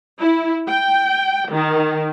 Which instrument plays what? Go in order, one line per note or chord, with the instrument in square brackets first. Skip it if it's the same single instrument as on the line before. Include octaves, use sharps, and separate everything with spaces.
[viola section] E4
G5
D#3